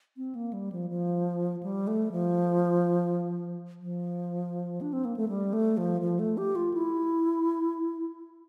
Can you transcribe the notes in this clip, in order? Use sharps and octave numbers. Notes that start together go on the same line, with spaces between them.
C4
A#3
G3
F3
F3
G3
A3
F3
F3
D4
C4
A#3
A3
G3
A3
F3
F3
A3
G4
F4
E4